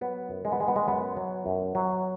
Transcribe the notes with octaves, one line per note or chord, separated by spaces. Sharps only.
F#3 B3
F#2
G#3
B3
D#3 G#3
B3
G#3
F#2 B3
F#3
F#2
F#3